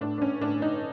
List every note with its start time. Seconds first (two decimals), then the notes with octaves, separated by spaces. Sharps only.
0.01 A2 D4
0.18 D4
0.22 C#4
0.41 A2 D4
0.62 D#4